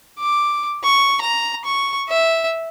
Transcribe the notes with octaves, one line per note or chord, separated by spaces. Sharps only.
D6
C#6
A#5
C#6
E5